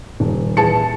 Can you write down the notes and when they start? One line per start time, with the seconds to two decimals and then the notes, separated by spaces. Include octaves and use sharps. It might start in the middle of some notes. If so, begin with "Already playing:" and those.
0.20 D#1
0.57 E3 G#4 A5 C#7